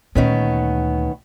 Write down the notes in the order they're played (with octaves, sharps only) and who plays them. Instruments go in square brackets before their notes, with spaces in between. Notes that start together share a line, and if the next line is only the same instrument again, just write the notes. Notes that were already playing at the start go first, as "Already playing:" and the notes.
[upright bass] D2 A#2 [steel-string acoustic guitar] D#3 B3 C#4